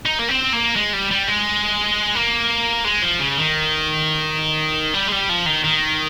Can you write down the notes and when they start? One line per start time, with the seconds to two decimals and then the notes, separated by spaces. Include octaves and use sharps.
0.06 D#4
0.19 A#3
0.29 C4
0.53 A#3
0.76 G#3
0.93 G3
1.11 G3
1.28 G#3
2.15 A#3
2.85 G#3
3.02 F3
3.20 C#3
3.38 D#3
4.94 G3
5.07 G#3
5.12 G3
5.29 F3
5.46 D#3
5.64 D#3